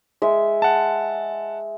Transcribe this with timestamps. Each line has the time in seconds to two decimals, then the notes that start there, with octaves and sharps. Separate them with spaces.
0.22 G#3 E5
0.62 F#5 A5